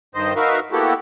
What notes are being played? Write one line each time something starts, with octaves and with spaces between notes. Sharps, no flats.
G2 D#3 C5 D#5
D#4 F#4 A#4 B4 E5 F5
A#3 B3 E4 F#4 G4 A4